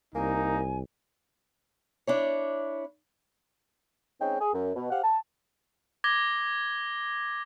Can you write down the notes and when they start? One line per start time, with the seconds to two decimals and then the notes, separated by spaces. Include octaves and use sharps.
0.15 C2 A#3 D#4 G#5
2.07 D4 E4 C#5
4.21 G#3 C4 C#4 D#4 G5
4.40 G#4
4.54 F#2
4.76 B2
4.90 G4 C5 F5 F#5
5.03 A5
6.04 D6 G#6 A#6 G7